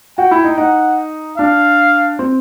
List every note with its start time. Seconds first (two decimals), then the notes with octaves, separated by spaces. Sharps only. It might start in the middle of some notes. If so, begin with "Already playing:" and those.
0.18 F#4 G5
0.31 E4
0.45 D#4
0.58 D#4 F#5
1.38 D4 F5
2.19 C4